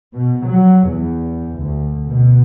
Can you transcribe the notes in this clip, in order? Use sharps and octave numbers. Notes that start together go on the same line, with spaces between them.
B2
F#3
E2
D2
B2